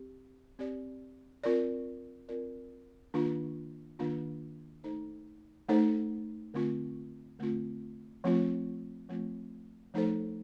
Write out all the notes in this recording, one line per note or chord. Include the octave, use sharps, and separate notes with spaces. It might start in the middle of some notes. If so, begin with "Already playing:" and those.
Already playing: C4 G4
C4 G4 D5
C4 F4 A#4 D5
C4 F4 A#4 D5
D#3 A#3 D4 F4
D#3 A#3 D4 F4
A3 D#4 A4 C5
A3 D#4 A4 C5
D3 A3 C4 F4
D3 A3 C4 F4
F3 A3 C4 F4
F3 A3 C4 F4
F3 A3 D#4 A4 C5